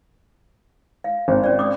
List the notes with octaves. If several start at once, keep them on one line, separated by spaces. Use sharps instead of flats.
F5
G#1
C#4 D5
D6 D#6